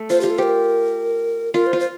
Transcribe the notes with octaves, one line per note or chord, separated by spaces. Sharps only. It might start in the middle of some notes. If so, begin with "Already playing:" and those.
Already playing: A3
F4 C5
F4 G4
A4
G4 A#4 C5
F4 A#4
C5
F4
C5